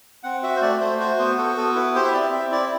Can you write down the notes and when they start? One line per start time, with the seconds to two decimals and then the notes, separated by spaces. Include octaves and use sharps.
0.24 C4 F#5
0.43 F#4 E5
0.56 C5
0.62 A3 D5
0.81 A3 C5
0.99 F#4 C5
1.18 B3 C5
1.38 F#4 A4
1.57 B3 A4
1.75 E4 B4
1.95 G4 C5
2.05 E5
2.13 C4 D5
2.32 C4 E5
2.52 E4 D5